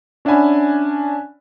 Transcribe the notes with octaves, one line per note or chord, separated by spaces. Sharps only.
C#4 D4 E5 F#5 G#5 B5